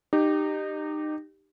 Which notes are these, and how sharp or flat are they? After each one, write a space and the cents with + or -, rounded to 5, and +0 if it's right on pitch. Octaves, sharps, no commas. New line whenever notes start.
D#4 -25 G4 +0